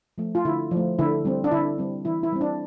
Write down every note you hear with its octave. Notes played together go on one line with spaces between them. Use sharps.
F3 A3
F4
D3 E4
F3
A3
D3 E4
G3 C4
D4
D3 E4
G3 C4
E3 E4
E4
G3 C4
D4